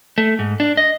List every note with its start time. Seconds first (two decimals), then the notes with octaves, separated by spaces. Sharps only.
0.18 A3
0.39 G#2
0.60 D4
0.77 D#5